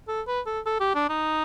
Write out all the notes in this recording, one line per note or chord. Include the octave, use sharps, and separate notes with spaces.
A4
B4
A4
A4
G4
D4
D#4